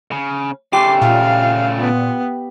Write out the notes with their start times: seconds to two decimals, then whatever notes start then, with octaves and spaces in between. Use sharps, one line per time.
0.12 C#3
0.73 C#3 A3 G4 C6 D6
1.01 A#2 F5
1.80 B3